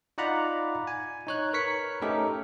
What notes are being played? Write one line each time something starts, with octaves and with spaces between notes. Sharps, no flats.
D#4 F4 D5 F#5 A#5 B5
G#5
D#4 C#5 F#6
A#4 B4 C#5 B6 C#7
A3 C#4 D#4 G4 A4 A#4